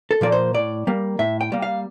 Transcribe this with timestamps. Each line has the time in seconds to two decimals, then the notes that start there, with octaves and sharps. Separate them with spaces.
0.11 A4
0.21 A#2 F3 A#3 D5
0.32 C5
0.54 A2 D5
0.87 G3 A#3
1.19 A2 E5
1.41 G5
1.52 G3 A#3
1.62 F5